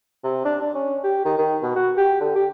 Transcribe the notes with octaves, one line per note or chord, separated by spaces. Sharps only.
C3
D4
D4
C#4
G4
D#3
D#3
B2
F#4
G4
D3
G4